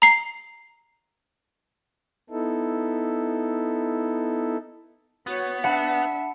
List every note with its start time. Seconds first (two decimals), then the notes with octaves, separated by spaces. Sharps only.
0.02 A#5 C7
2.30 B3 D#4 E4 A4
5.27 B3 F#4 C#5
5.64 D4 E5 F#5 A5 B5 C#7